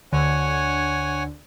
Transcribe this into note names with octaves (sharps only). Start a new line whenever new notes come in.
D2 D3 C#5 F#5 G#5